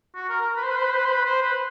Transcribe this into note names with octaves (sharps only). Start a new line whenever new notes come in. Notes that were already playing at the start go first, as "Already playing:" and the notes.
F#4
A#4
A#4
B4
C5
B4
C5
B4
C5
B4
C5
B4
C5
B4